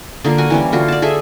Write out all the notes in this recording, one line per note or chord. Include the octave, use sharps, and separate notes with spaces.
D3 A#3 F4
F#4 F#5 G#5
E3 G3 C#4
D3 F4 F#4
D5 A5
G#4 A4 E5 G#5